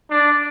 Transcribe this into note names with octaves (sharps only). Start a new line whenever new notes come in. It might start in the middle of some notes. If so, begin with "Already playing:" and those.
D4